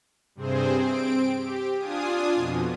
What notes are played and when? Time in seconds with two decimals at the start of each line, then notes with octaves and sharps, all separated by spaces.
0.35 G2 C3 C4 G#4 C5
0.76 C4 D7
1.37 G4
1.78 D4 F4 G#5 D#6
2.34 F2 B2